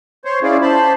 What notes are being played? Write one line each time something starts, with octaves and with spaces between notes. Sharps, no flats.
C5 C#5
C#4 E4 F4 G#4 D5
C5 A5 B5